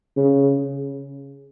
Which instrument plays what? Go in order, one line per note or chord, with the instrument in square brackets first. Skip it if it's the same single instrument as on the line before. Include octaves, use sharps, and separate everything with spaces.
[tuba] C#3